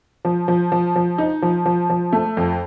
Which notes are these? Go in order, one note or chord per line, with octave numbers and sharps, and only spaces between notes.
F3
F3
F3
F3
D#4
F3
F3
F3
A3
F2